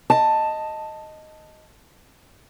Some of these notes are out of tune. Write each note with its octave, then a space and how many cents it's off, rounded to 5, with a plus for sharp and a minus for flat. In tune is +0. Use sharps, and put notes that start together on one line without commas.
D#5 +0 A5 +5